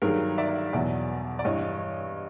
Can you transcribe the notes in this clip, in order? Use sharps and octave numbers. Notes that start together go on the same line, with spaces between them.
G2 D#3 F#3 G#4 A#4
D5 E5
E2 B2 F#3 D5 E5
D5
G2 E3 C#5 D#5